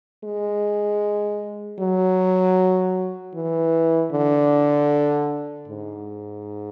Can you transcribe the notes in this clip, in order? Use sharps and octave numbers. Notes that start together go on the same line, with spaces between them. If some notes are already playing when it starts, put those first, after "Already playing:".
G#3
F#3
E3
D3
G#2